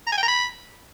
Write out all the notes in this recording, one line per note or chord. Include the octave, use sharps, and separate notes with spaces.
A#5
G#5
G5
A#5
B5